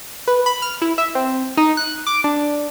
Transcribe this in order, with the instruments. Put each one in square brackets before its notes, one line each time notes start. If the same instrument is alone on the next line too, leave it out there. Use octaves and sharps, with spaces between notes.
[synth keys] B4
B5
F6
E4
E5
C4
D#4
F#6
D6
D4